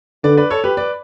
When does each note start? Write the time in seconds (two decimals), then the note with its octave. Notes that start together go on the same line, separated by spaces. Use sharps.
0.24 D3 B4 D5
0.37 B4 D5
0.50 A4 C#5
0.64 G4 B4
0.77 B4 D5